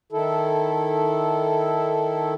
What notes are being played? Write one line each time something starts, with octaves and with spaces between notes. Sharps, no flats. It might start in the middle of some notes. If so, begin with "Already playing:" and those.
D#3 E4 A4